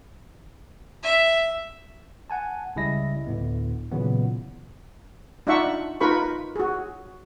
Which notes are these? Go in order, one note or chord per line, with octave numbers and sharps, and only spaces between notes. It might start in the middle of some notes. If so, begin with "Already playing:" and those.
E5
F#5 G#5 A5
C#2 C#3 G3 E4 D#5 A#6
D2 A2 D3 B3
A#2 C#3 E3 F#3 B3
D4 D#4 F4 E5 F#5 C#6
D#4 F4 A#4 B4 B5 C#6
F#4 G#4